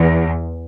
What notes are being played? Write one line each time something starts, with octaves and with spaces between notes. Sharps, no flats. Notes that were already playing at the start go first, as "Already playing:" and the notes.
Already playing: E2